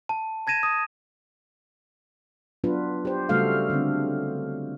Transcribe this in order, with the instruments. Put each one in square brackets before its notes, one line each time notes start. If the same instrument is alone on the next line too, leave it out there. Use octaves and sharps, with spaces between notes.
[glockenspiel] A5
A5 G#6 A#6 D#7 E7
D#6
[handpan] F#3 B3 D4 F4 B4
G4 C5
C#3 G3 A3 F#4 A4 F5
D3 C4